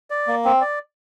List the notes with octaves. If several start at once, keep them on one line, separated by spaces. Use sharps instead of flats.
D5
A#3
C4
D5